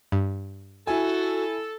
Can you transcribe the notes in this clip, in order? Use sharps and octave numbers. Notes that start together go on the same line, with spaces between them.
G2
E4 F#4 A4 G#5